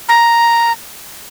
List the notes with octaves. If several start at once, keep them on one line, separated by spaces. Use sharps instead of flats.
A#5